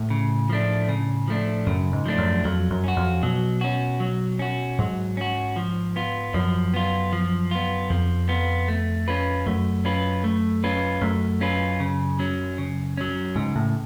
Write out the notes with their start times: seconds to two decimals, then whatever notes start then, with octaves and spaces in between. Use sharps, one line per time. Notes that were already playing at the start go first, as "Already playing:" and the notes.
Already playing: A2
0.10 C#3
0.49 F3 A3 D4
0.89 C#3
1.28 F3 A3 D4
1.67 F#2 C#3
1.93 G#2
2.06 F3 A3 D4
2.18 F#2
2.45 F2 F#3
2.71 F#2
2.84 C#4 F#4
2.97 F2
3.23 B2 F#3
3.61 C#4 F#4
4.00 F#3
4.39 C#4 F#4
4.79 G#2 F#3
5.17 C#4 F#4
5.56 F3
5.96 B3 F4
6.34 F#2 F3
6.74 B3 F4
7.13 F3
7.51 B3 F4
7.90 F2 F3
8.29 B3 F4
8.68 A3
9.08 C#4 F4 B4
9.46 F#2 A3
9.85 C#4 F4 B4
10.24 A3
10.64 C#4 F4 B4
11.01 F#2 A3
11.41 C#4 F4 B4
11.80 C#3
12.19 F#3 C#4
12.58 C#3
12.97 F#3 C#4
13.36 G#2 C#3
13.56 A2